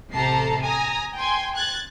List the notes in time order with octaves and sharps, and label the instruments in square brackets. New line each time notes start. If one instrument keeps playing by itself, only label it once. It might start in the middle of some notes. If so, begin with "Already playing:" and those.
[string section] A1 C3 A4 A5 A#5 C7
G#5 A#5 D#6 A#6
G5 G#5 C6
F#6 G#6 A6